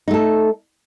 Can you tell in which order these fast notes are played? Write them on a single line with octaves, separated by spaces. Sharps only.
D#4 A3 A4